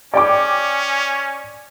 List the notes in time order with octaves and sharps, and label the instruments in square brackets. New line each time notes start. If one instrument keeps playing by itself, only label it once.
[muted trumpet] C#4 [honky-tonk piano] D5 G5 D6